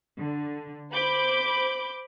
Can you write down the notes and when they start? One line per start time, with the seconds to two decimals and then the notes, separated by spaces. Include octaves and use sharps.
0.18 D3
0.93 C5 B5 D6 G6